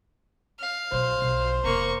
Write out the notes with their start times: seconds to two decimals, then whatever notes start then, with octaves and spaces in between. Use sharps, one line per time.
0.59 F5
0.92 B1 C5
1.22 B1
1.64 F1 E2 A#3 C#6